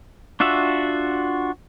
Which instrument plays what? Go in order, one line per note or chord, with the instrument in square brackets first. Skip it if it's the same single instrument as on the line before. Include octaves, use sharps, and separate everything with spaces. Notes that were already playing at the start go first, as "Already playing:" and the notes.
[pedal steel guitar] D4 F4 F#4 E5